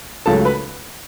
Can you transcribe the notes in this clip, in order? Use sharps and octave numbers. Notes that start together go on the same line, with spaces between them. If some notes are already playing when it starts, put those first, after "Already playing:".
C#2 C#3 F#3 A3 A4 A5
B4 B5